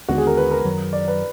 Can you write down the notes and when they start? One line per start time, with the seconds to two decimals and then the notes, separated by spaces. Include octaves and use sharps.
0.09 D#2 D3 G#3 B3 F#4
0.18 G#4
0.27 A#4
0.37 B4
0.51 A#4
0.65 F#2 D#3 F#3
0.93 D5
1.08 B4